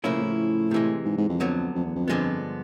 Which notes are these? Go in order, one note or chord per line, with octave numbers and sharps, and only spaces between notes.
A2 C#3 F3 A#3 C#4 E4
A2
C3 E3 G#3
G#2
G#2
F2
D2 D3 F#3 B3
F2
E2
F2
G2 D3 F3 G#3 B3